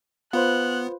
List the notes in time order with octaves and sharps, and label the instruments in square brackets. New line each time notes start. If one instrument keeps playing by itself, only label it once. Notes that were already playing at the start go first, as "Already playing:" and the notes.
[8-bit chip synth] B3 [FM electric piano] F4 B4 C5 [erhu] F#6